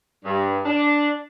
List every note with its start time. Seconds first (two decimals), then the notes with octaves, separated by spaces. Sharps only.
0.24 G2
0.66 D4